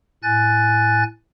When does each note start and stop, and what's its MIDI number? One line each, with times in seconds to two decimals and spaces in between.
0.23 1.03 45
0.23 1.03 80
0.23 1.03 90
0.23 1.03 93